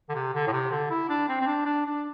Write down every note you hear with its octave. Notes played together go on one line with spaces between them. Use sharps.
D3
C3
D3
A2
C3
D3
E4
D4
C4
C4
D4
D4
D4